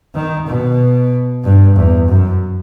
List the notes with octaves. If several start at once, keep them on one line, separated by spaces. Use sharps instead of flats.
D#3
B2
G2
E2
F#2